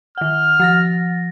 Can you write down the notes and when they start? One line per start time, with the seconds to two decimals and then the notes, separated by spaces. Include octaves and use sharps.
0.18 D#3 F#5 F6
0.60 F3 A6 A#6